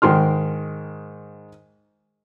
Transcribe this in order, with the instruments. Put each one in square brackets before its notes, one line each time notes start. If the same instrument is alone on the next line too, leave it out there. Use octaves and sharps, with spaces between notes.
[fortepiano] G#2 D#3 C6 F6